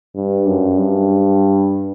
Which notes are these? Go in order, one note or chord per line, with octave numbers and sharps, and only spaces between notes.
G2
F#2
G2